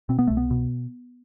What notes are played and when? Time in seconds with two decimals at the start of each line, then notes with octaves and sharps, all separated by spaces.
0.09 B2 C4
0.19 B3
0.27 C2 A3
0.37 B3
0.51 B2